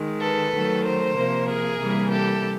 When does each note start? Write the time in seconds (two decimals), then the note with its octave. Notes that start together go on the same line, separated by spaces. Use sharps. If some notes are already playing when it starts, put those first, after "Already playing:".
Already playing: D#3 G#3
0.20 A4 B4
0.53 D#3 F#3 A3
0.84 A#4 C5
1.16 C3 F3 A#3
1.48 G#4 A#4
1.81 C3 E3 G3 A#3
2.12 G4 A4